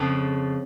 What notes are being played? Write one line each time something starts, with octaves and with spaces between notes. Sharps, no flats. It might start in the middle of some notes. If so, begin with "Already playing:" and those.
Already playing: F2 C#3 F3